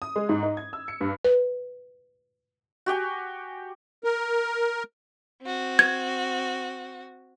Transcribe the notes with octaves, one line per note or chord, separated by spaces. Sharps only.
D#6
G#3
G#2
D#4
G#6
E6
C#7
G2
B4
F#4 G4 G5 G#5
A#4
C4 F#4
G#6